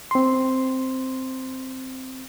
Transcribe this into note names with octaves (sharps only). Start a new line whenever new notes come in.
C4 C6